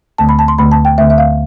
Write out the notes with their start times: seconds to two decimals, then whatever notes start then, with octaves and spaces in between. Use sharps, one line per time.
0.18 D2 D3 A3 A5
0.29 B5
0.39 A5
0.48 C6
0.58 D2 D3 A3 B5
0.72 A5
0.85 G5
0.98 D2 D3 A3 E5
1.10 E5
1.18 F5